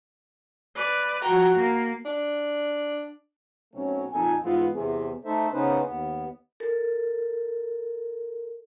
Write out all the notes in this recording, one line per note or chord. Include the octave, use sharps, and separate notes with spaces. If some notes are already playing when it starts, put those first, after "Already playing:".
B4 D5
F3 F#4 G5 A#5
A#3
D4
B1 B2 F#3 A3 C4 C#4
F2 A#2 D#4 A4 G#5
G#2 E3 B3 C4 F4 F5
E2 C3 G#4
A3 D#4 A4 C5 E5
C#3 B3 C#4 D#4 B4 C5
D#2 B3
A4 A#4